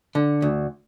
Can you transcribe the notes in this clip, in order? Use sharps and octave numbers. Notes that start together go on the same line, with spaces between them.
D3
D2